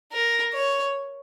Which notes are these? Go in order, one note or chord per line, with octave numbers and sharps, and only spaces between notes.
A#4
C#5